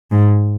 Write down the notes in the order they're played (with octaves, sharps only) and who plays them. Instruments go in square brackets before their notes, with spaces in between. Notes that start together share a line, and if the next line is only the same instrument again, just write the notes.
[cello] G#2